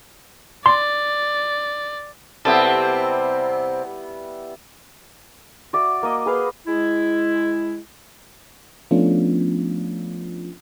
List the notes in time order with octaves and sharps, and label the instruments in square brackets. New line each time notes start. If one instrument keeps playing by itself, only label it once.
[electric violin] D5 [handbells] C6
[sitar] C3 C4 [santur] G3 B3 E4 [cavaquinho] A4
[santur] F#4 D5 E5
A#3 D#5
G#4 B4 F5 F#5
[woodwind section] G#3 E4
[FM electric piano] F3 A3 B3 C#4 D4 F4